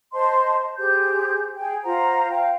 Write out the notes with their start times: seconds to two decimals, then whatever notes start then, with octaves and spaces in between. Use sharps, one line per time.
0.13 C5 D#5 A5 C6
0.78 G4 G#4 C5 G6
1.57 G#4 G5
1.84 F4 C5 F#5 A#5
2.30 C5 F5 G5